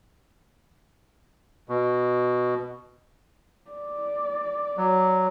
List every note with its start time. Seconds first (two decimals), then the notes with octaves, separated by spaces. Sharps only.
1.69 B2
3.71 D5
4.78 F#3